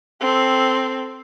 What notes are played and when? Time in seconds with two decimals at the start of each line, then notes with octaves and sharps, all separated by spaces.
0.21 C4 A4